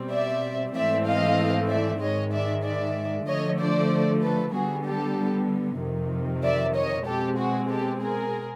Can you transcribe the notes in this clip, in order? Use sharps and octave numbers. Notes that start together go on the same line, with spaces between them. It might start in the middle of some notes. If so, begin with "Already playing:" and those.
Already playing: B2 G3 C4
D5 E5
G#2 E3 A3 C4 D5 E5
D#5 F5
D5 E5
G#2 D#3 G#3 C#5 D#5
D5 E5
D5 E5
D3 F3 A3 C#5 D#5
C5 D5
A4 B4
D3 G3 B3 F#4 G#4
G4 A4
F2 C3 D#3
D5 E5
C#5 D#5
B2 G#3 C4 G4 A4
F#4 G#4
G4 A4
G#4 A#4